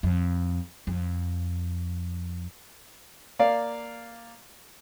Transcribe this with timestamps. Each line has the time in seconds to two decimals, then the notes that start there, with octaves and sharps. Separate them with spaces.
0.03 F2
0.87 F2
3.39 A#3 D5 F5